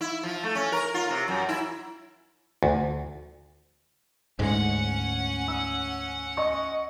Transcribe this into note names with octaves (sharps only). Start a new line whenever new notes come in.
E4
F3
A3
C#4
A#4
F4
C3
F#2
E4
D2
D2 G#2 G#3 C#4 F#5
E6
D#5 C#6